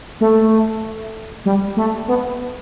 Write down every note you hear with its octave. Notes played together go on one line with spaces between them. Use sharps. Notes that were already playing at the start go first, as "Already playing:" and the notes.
A3
G3
A3
B3